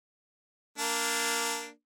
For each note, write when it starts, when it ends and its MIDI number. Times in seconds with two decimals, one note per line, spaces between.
0.78 1.70 58
0.78 1.70 62